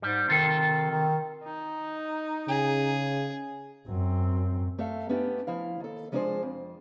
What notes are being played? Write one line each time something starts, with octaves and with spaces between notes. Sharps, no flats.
G#2 G3
C3 D#3 F4 A4
D#3
D#4
C#3 G#4
F#2 C4
A3 A4 E5 F5
A3 B3 C#4 D4 G4
F3 E4 F5
D#2 A4
F3 G#3 D4 D#4 G#4 C5
F2